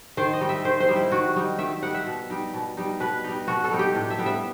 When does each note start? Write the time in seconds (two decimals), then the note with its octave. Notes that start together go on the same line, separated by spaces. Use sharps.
0.17 D#3 C5
0.33 D#5
0.40 G3 D#4
0.49 E5
0.65 D#3 C5
0.80 C5
0.88 G3 D#4
0.96 E4
1.12 D#3 F#4
1.36 G3 D#4
1.59 D#3 E5
1.82 G3 D#4 F#5
1.94 E5
2.06 B2
2.30 G3 D#4
2.54 B2
2.77 G3 D#4
3.00 B2 B4
3.24 G3 D#4
3.47 B2 F#4
3.64 A4
3.71 G3 D#4
3.79 G4
3.95 A2
4.10 E5
4.19 G3 B3
4.26 E5